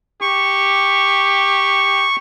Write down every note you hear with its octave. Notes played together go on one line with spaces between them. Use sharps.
G4 C#6